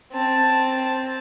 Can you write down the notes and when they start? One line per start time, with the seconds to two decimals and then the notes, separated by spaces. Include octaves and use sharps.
0.13 C4 A5